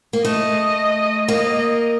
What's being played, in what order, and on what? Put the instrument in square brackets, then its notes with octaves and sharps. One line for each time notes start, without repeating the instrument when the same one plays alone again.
[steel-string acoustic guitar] A#3
[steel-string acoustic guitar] A3 [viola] D#5
[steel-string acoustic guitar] A#3 [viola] D#5